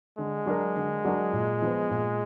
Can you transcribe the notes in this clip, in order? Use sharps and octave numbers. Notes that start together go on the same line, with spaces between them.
D3 G#3
F#3 D4 F#4 A#4
D3
F#3 D4 F#4 A#4
A#2
F3 B3
A#2